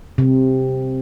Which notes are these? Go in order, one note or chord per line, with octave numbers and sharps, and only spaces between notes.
C3